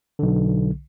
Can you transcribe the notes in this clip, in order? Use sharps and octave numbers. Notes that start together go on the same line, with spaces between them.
B1 D3